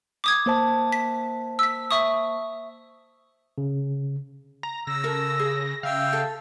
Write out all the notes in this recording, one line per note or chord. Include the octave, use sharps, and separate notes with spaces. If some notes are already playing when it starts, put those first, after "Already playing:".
D6 D#6 G#6
A#3 C5 A5
B6
E6 B6
E5 C#6 D#6
C#3
A#5
C#3 E6 A#6
A4 A#4
G#4
C#3 E5 F5 G5
A4